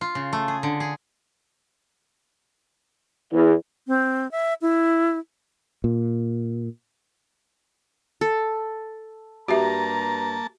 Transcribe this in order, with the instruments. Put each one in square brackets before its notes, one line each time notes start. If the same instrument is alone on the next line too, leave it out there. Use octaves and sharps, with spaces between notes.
[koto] F4
C#3
A3
G#4
D3
G#4
[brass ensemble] E2
[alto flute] C4
E5
E4
[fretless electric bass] A#2
[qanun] A4
[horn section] G2 A#5 [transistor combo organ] A#3 A5 [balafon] F#4 G4 E5